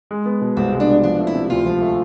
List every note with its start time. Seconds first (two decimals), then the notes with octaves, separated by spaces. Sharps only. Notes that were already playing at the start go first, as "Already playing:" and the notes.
0.11 G#3
0.26 B3
0.41 B2
0.57 C2 C4
0.72 G#3
0.80 D4
0.89 B3
1.03 F3 D4
1.19 A3
1.27 E4
1.35 C3
1.50 D2 F4
1.66 F3
1.81 A3